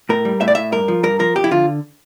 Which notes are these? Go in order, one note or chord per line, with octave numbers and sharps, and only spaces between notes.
A2 A#4
G3
A2 E5
D5
A2 E5
G2 A#4
F3
G2 A#4
F3 A#4
F2 G4
E4
D3 F4